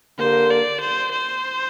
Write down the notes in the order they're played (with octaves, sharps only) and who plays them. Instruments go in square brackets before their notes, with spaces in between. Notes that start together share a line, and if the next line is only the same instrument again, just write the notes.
[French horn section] D3 A#3 G4 A#4 [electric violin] C5
[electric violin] D5
C5
C5